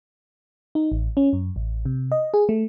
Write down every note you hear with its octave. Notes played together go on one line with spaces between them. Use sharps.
D#4
A1
C#4
F#2
A1
C3
D#5
G#4
A3